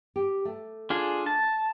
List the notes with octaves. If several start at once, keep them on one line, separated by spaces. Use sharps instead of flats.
G4
A3
D4 F4 G#4
A5